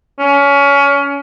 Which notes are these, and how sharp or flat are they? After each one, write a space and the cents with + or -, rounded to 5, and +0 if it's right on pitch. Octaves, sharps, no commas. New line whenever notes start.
C#4 +25